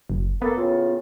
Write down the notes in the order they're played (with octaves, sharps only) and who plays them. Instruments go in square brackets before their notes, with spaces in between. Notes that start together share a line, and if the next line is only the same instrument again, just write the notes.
[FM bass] F#1
[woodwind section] A#3 A4 [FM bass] B3
[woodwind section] A2 C#3 F4